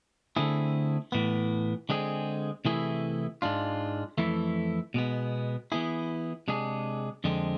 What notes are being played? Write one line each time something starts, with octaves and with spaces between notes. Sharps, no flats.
D3 A3 C4 E4 G#4
A2 E3 B3
D3 G#3 C4 G#4
C3 E3 A3 E4 G#4
G#2 G#3 D4 F4
F2 E3 A3 E4
B2 G#3 B3
E3 B3 E4 G#4
C3 G#3 D4 G#4
F2 D3 G#3 C4